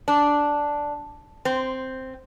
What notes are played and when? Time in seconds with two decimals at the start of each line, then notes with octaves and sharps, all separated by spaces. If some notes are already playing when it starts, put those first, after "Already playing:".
0.08 D4
1.45 C4